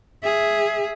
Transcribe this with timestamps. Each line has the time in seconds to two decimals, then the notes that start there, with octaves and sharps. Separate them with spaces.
0.23 G#4 E5